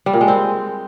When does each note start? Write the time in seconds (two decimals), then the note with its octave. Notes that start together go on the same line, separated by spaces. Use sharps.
0.06 G3
0.14 A#2
0.21 G#3
0.28 C4